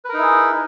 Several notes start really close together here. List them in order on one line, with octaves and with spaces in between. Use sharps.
B4 A#4 D#4 E4 G#4